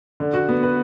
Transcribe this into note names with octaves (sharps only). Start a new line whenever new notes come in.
D3
F#4
B3
B4